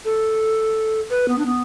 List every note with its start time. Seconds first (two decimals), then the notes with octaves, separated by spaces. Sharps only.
0.05 A4
1.10 B4
1.28 B3
1.38 D4
1.46 B3